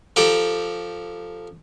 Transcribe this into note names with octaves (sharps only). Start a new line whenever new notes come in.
F3 G4 A4 A#5